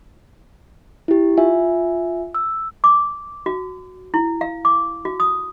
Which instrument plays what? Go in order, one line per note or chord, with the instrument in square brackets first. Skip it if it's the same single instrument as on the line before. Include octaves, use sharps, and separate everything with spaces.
[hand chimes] E4 G4
F4 E5 G#5
E6
[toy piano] D6
F#4
E4
F5
D6
F#4
D#6